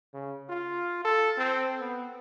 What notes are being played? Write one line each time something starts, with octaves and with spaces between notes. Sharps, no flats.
C#3
F4
A4
C4
B3